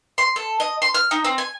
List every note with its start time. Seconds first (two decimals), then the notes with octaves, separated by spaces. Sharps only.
0.18 C6
0.36 A4
0.60 D#5
0.82 C6
0.94 F6
1.11 D#4
1.24 C4
1.38 G#5